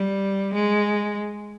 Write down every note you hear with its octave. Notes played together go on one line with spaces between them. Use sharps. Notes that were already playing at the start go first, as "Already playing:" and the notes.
Already playing: G3
G#3